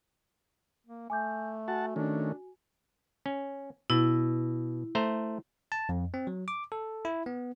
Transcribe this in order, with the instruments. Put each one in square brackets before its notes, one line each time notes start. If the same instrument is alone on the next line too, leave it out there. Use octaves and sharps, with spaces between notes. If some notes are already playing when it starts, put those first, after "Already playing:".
[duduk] A#3
[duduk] A3 [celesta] G#5 D6 G6
[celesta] F#4 G#5 [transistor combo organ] F#5 A5
[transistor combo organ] D#3 A3 C#4 [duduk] D4
[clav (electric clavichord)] C#4
[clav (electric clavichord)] B2 [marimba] E4
[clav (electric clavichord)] A3 C5 A#5
[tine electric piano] A5
F2
C4
F#3
D6
A4
E4
B3